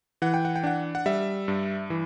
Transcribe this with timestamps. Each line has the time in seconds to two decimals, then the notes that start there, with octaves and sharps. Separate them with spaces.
0.22 E3 F#5
0.34 G5
0.45 F#5
0.56 G5
0.64 D4 F#5
0.95 F#5
1.06 G3 E5
1.48 G2
1.90 E3